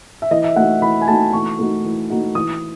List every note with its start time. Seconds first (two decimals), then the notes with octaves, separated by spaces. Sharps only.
0.22 E5
0.31 E3 D#5
0.44 E5
0.56 A3 D#4 F#4 F#5
0.82 E3 B5
1.01 G#5
1.08 A3 D#4 F#4 A5
1.33 E3 C#6
1.59 A3 D#4 F#4
1.85 E3
2.10 A3 D#4 F#4
2.35 E3 D#6